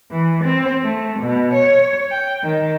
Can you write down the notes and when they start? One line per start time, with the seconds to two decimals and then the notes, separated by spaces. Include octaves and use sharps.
0.12 E3
0.44 C4
0.83 A3
1.19 B2
1.54 C#5
2.11 G5
2.43 D#3